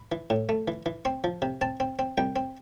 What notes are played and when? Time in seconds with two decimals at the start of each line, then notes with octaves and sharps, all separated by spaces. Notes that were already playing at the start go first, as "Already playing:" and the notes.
Already playing: B5
0.12 E3
0.30 A2
0.49 A3
0.68 E3
0.86 E3
1.05 C4 C6
1.24 F3
1.42 C3
1.61 C4 A5
1.80 C4
1.99 C4
2.18 C2 G5
2.36 C4